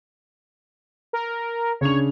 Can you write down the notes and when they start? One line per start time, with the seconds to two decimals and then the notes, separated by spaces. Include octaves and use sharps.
1.13 A#4
1.81 C#3 D4 C#5 F7